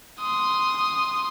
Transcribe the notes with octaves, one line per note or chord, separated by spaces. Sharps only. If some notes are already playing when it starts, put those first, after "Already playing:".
C6 D#6